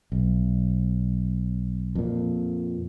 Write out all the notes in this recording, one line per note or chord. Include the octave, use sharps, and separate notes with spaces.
B1
F2 A#2